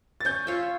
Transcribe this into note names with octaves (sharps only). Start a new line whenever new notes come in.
A6
C#4 G6
F4 C#5 E5